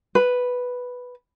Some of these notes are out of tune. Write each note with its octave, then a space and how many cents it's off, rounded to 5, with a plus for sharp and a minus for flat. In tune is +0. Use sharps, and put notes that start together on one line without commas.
B4 +0